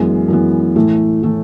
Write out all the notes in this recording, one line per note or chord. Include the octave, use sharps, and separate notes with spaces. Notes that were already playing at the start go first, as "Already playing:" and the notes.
Already playing: F#2 E3 G#3 B3
F#2 E3 G#3 B3
A2 E3 A3
A2 E3 A3